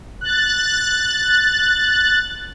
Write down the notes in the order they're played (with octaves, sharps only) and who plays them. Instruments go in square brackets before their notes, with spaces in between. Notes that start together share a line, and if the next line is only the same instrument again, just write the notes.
[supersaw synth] F#6 A6